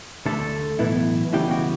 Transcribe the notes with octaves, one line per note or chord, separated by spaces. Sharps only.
D2 D3 A3 A4
B1 A2 E3 B3 E4
C#2 C#3 E3 G3 B3 G4
F#4